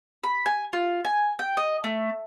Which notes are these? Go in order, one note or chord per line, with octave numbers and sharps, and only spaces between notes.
B5
G#5
F4
G#5
G5
D#5
A3